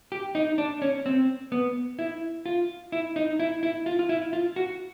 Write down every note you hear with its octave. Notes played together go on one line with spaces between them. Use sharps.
G4
D#4
D4
C#4
C4
B3
E4
F4
E4
D#4
E4
E4
F4
F4
E4
F4
F#4